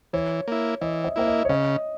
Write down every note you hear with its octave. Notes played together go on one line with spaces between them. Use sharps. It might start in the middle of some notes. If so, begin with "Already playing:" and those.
E3 C#5
A#3 E4
E3 D#5
E5
A#3 E4 E5
D#5
C#5
C#3 D#5